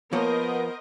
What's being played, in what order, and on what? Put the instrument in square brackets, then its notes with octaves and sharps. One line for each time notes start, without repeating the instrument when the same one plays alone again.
[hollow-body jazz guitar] F3 A#3 C#5 [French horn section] B3 [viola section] A#4 C5 D#5